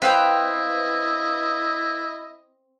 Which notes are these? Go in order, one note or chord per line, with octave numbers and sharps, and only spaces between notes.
C4 E4 B4 D#5 F5 G5